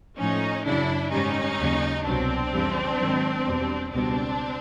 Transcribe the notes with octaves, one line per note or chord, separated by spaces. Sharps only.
A2 F3 C#4 D#4
F#2 C#3 F#3 D4 E4
G#2 D#3 G3 C#4 D#4
D#2 C#3 F#3
C2 B2 F#3 C4 D4
F2 C#3 E3 G3
G#2 D#3 F#3
E2 B2 G3
C#2 B2 G3 C4 D4